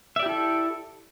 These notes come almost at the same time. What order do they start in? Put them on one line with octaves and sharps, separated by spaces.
E5 D5 G4 E4 A4